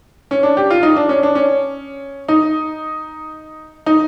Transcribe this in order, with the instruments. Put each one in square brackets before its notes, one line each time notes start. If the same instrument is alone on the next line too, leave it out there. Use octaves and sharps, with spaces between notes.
[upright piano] C#4
D4
G4
F4
D#4
D4
C#4
D4
C#4
D#4
D#4